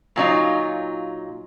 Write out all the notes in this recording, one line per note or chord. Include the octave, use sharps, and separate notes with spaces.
A#2 F#3 D#4 F4